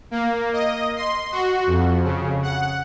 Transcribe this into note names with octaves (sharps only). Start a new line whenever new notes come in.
A#3
D#5
C6
F#4
F2
C#3
F#5